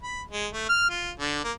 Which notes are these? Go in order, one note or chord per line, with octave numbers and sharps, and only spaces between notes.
B5
G#3
A3
F6
F4
D3
A#3